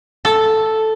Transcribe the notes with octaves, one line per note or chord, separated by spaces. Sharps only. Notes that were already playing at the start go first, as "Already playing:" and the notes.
A4